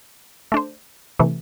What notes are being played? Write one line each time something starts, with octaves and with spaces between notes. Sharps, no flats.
A3 D4 C5
C3 E3 A3